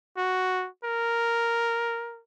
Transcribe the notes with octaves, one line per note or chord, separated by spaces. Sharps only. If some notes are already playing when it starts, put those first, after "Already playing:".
F#4
A#4